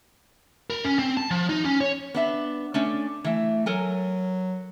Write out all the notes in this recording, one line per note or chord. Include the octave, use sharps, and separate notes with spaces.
A#4
C#4
C4
A5
F3
D#4
C#4
C#5
B3 D4 E5
A3 C#4 D4
E3 A3 E5
F#3 A4 A#4 G#5